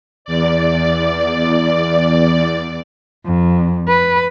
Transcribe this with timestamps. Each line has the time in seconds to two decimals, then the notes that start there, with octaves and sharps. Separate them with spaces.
0.25 E2 D5
3.26 F2
3.88 B4